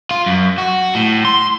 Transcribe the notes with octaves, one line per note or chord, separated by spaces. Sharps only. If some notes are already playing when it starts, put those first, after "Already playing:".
F4
F#2
F#4
A2
C6